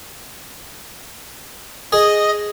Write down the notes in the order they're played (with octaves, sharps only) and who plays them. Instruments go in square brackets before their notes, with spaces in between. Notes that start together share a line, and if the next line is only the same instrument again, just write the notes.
[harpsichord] G#4 [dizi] D#5